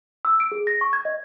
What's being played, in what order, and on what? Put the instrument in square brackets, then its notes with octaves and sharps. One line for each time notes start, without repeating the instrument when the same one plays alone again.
[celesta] E6
D7
G#4
A#6
C#6
G#6
D#5